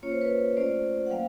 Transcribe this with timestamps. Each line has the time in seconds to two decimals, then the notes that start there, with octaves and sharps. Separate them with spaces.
0.02 A#3 C#4 F4 C#5
0.12 C5
0.21 B4 C#5
0.57 A3 C#4 F4 C5 D5
1.06 F#5
1.11 F#3 A#3 F5 G5